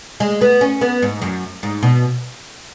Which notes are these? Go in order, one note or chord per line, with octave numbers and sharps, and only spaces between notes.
G#3
B3
C#4
B3
G#2
F#2
G#2
B2